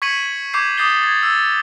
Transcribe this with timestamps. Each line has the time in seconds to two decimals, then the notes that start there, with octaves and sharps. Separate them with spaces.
0.02 C#6 G#6 B6 C#7 D#7 F#7
0.54 C#6 D6 G6 G#6 C7
0.78 D6 D#6 G6 A6 C7 G7
1.03 G#6 A6
1.23 E6 A6